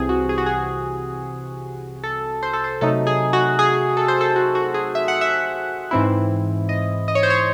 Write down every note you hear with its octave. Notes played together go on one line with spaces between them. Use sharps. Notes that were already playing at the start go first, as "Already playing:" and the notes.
Already playing: C2 C3 E3 C4 G#4
F#4
G#4
F#4
G#4
A4
C5
A4
C5
C3 F#3 A3 D#4 A4
G#4
F#4
G#4
A4
C5
A4
F#4
F#4
G#4
E5
F#5
E5
G#2 E3 C4 E4
D#5
D#5
C#5
C5
C#5